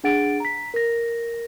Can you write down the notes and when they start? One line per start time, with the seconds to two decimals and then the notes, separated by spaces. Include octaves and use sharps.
0.04 D4 G#4 F#5 A6 D7
0.40 A#5 B6
0.74 A#4 A#6